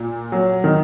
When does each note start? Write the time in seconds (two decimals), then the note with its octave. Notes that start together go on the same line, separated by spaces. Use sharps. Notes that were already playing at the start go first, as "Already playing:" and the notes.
Already playing: A#2
0.32 F#3
0.64 D#3